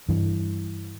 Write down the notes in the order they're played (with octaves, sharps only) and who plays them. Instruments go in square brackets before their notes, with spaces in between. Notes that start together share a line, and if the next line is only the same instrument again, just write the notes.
[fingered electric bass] G2 E3